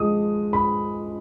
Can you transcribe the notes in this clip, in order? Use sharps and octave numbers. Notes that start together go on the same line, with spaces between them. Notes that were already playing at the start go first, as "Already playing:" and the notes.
Already playing: F3 G#3 D#6
B5